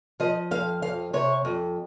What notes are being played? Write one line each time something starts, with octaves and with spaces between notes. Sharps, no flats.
F3 D#5
F2 F5
F2 F5
C3 C#5
F2